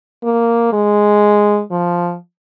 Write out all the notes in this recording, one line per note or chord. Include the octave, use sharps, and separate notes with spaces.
A#3
G#3
F3